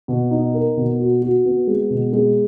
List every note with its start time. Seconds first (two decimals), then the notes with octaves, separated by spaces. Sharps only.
0.08 B2
0.31 D#4
0.54 A#4
0.77 B2
1.00 F#4
1.22 F#4
1.45 B3
1.67 G#3
1.90 B2
2.13 G#3